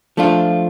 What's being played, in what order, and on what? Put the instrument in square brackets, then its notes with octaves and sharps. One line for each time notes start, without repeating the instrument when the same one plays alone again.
[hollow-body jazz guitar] F3 A3 D4 F4